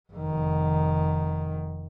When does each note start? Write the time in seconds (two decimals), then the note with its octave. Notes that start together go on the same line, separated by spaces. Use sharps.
0.12 F1 D#3